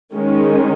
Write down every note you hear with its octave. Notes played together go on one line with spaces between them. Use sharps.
D#3 G#3 C#4